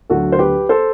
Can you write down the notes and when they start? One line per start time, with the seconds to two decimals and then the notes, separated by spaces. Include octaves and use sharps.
0.09 D2 D3 F#3 F#4 A4
0.32 C5
0.39 G4 B4
0.69 A4 C5